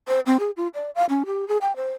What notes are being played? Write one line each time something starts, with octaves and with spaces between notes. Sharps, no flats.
C5
C4
G#4
F4
D5
F5
C#4
G4
G#4
G5
C5